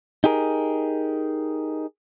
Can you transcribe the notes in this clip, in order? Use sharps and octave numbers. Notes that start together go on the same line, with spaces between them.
D#4 G4 G#4 A#4